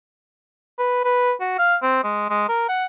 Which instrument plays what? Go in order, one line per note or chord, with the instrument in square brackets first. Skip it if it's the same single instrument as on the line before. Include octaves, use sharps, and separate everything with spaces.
[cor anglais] B4
B4
F#4
F5
C4
G#3
G#3
A#4
F#5